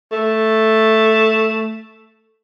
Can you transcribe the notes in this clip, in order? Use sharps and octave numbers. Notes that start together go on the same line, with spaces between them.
A3